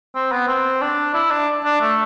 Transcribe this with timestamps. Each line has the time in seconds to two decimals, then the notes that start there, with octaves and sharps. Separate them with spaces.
0.15 C4
0.32 B3
0.48 C4
0.82 D4
1.14 E4
1.31 D4
1.64 D4
1.81 A3